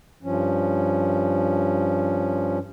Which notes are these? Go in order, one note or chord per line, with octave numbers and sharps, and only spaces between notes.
G2 F3 C#4